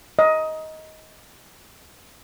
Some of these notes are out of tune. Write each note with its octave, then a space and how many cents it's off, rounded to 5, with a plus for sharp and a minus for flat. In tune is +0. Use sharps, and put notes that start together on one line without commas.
D#5 +15